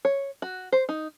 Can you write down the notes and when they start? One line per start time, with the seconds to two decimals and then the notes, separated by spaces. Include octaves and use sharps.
0.05 C#5
0.42 F#4
0.72 C5
0.89 D#4